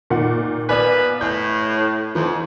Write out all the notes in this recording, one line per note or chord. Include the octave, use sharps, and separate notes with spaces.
A#2 D#3 F#5
A#3 B3 B4 D5 G#5
A2 G6
F2 E3